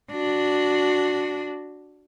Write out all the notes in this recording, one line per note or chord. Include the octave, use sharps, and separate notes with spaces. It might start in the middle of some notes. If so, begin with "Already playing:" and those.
D4 F#4